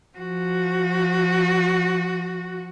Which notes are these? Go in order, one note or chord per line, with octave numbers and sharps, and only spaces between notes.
F3 F#4